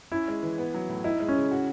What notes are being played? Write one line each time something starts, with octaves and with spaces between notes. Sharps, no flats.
C#4 E4
G#3
E3
B3
F#3
A2
D#4 E4
G#3
C#4
C#3
F#4